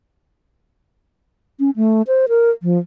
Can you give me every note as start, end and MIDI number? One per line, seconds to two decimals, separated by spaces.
1.60 1.70 61
1.76 2.02 57
2.07 2.26 72
2.29 2.50 70
2.63 2.78 53